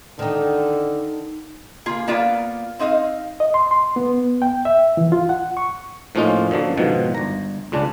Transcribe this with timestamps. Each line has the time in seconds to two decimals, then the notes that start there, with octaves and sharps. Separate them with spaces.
0.19 D3 D#3 D#4
1.86 A#3 F4 G#4
2.08 A#3 B3 F4 D5 F5
2.79 C4 D#4 D#5 F5
3.40 D#5
3.54 C6
3.71 C6
3.96 B3
4.42 G5
4.65 E5
4.97 E3
5.12 F4
5.29 F#5
5.57 C#6
6.15 A2 F3 A#3 C#4 D#4 F4
6.51 F#2 D3 F3 A#3
6.77 G#2 B2 D#3 F3
7.15 G1 A#5
7.72 C#2 C#3 D4